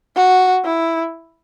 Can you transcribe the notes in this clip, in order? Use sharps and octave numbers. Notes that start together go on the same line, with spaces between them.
F#4
E4